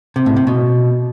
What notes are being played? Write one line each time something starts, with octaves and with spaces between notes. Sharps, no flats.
C3
A2
C3
B2